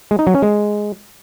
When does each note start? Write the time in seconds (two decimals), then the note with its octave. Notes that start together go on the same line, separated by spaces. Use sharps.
0.11 G#3
0.19 D#4
0.27 F#3
0.35 C#4
0.42 G#3